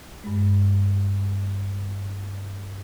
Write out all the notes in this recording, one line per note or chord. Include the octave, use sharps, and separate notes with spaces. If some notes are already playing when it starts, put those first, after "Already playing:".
G2 G#3